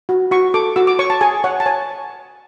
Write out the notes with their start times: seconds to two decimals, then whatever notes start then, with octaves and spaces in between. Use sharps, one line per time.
0.09 F#4
0.31 F#4 C#6
0.54 A4 D6
0.76 F#4 E6
0.87 D6
0.99 C#5 C#6
1.10 A5
1.21 G#4 G#5
1.44 C#5 F#5
1.60 A5
1.66 C#5 G#5